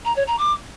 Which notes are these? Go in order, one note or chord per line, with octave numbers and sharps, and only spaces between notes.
A#5
C#5
A#5
D6